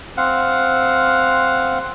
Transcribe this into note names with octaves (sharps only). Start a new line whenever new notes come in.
C4 F5 F#5